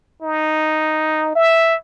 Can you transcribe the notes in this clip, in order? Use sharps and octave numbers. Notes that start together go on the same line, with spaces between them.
D#4
E5